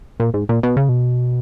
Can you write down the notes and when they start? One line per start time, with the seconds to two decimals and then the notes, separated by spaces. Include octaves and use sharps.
0.20 A#2
0.34 G#2
0.49 A#2
0.63 B2
0.77 C#3
0.89 B2